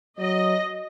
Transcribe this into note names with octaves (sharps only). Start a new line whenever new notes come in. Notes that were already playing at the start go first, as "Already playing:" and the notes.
F#3 D#5